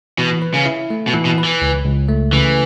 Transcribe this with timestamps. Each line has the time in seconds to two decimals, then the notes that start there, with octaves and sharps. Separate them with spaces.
0.18 B2 E3
0.42 B4
0.54 C#3
0.66 E4
0.90 A3
1.07 B2
1.14 E3
1.25 B2
1.38 B4
1.44 E3
1.62 C#2
1.85 C#2
2.08 A3
2.32 C#3 E3